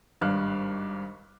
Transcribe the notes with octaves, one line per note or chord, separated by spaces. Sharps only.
G#1 G2 D4 F5 F6 F#6